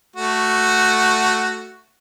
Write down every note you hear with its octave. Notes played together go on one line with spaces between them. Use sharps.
A3 F#4